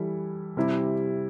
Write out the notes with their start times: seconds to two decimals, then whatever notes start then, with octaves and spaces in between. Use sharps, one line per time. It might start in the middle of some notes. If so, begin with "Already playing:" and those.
Already playing: E3 G3 E4 A4
0.57 C3 G3 E4